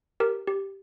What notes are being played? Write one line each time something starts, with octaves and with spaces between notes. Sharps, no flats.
G4 A#4
G4